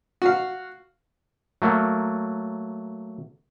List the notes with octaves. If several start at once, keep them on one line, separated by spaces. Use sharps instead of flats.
F#4 F5
F#3 A3 A#3